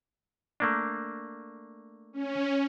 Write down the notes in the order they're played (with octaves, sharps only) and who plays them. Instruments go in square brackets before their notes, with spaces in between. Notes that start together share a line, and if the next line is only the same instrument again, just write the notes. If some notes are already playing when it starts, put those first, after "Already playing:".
[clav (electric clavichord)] A3 A#3 D4
[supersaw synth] C#4